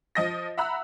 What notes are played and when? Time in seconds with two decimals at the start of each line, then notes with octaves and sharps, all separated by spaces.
0.15 F3 D#5 A#6
0.58 E5 F#5 A#5 B5 E6 F#6